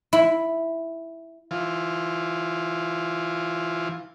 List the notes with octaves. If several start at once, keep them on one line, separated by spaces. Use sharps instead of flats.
E4
E3 F4